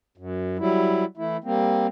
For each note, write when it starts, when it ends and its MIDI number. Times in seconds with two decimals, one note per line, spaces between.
0.18 0.57 42
0.59 1.05 54
0.59 1.05 55
0.59 1.05 64
1.17 1.37 52
1.17 1.37 57
1.17 1.37 64
1.44 1.87 55
1.44 1.87 58
1.44 1.87 60